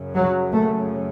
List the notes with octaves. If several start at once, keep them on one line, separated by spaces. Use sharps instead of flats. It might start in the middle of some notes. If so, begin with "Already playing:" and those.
Already playing: F#2 C#3
F#3
A3